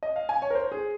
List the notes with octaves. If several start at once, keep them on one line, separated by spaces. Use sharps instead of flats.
D#5
F5
G#5
C#5
A#4
C5
G#4